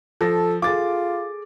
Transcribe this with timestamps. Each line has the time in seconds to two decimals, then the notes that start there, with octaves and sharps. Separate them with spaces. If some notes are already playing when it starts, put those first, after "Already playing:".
0.21 F3 A4 A5 A#6
0.62 F4 G#4 A4 D6 A6